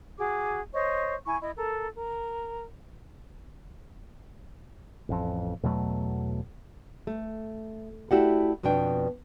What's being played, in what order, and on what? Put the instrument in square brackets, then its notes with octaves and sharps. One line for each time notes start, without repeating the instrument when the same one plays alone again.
[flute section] F#4 G#4 D6
C5 C#5 D#5 C#6
E4 G#5 C#6
E4 D#5
A4 A#4
A#4
[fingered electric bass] A1 F2
E2 B2 F#3 A3
[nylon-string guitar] A3
A3 E4 F#4 G4 D5 F#5
F2 B2 B3 D4 G5